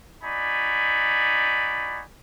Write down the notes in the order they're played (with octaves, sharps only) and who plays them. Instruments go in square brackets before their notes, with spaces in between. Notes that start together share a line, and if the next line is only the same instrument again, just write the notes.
[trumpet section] D#4 F#4 D5 G#5 B5